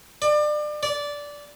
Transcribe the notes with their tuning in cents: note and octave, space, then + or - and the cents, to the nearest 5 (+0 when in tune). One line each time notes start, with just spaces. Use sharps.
D5 +30
D5 -15